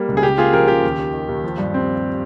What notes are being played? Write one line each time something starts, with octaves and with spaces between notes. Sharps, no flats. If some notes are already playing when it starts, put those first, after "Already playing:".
Already playing: G3 A#3
C#2
G#4
C#3 G4
A#3 F4 G#4
F3 G4 A#4
C#3 G4
D#2
D#3
D#3
D#2
F3
G2
C4